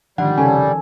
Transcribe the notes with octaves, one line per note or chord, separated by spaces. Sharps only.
G#2 D3 D#3 F3 G3 F#5
C2 F2 C#3 C#4 A4 G#5